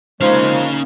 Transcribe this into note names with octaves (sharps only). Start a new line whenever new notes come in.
F3 G#3 A#3 C#4 D#4 C5 F5